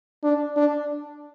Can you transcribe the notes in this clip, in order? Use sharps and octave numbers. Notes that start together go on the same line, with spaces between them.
D4
D4